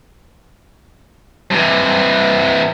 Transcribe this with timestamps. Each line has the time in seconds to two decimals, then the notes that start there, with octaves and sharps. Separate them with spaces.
1.51 C3 E3